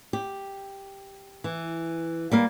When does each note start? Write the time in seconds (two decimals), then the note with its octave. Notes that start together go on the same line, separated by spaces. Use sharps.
0.13 G4
1.44 E3
2.32 G3 A#3 F5